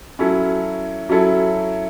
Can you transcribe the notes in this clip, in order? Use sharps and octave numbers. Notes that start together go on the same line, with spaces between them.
F#3 C#4 E4 A4
F#3 C#4 E4 A4